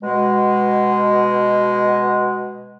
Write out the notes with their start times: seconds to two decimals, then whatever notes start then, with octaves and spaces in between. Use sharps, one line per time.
0.03 B2 G#3